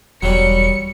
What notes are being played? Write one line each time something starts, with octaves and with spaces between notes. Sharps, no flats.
E1 F#3 G3 C#7